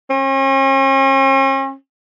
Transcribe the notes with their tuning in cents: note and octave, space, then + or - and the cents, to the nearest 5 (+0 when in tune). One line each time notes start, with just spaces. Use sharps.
C#4 -45